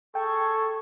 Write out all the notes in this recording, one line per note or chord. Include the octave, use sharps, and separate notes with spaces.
G#4 A4 G5 C#6